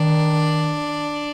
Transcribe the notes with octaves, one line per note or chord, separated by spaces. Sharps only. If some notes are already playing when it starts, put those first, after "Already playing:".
Already playing: D#3 D4